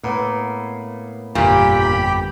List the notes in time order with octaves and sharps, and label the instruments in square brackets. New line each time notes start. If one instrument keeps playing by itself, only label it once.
[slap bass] A2 [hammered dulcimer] A#3 B3
[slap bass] G1 F2 [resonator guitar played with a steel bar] A#2 [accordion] G4 G5 B5